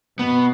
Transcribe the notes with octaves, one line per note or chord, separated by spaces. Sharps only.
B2 B3